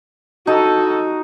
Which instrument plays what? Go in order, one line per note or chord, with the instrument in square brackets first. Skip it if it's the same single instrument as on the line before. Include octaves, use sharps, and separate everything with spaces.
[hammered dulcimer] D#4 D#5 [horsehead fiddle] F#4 [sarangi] A4